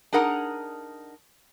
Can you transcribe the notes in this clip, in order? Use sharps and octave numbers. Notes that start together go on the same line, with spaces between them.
D4 D#4 G#4 A#4 F#5 A#5